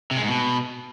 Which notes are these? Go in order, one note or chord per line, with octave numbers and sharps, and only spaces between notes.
C3
G#3
G#2
B2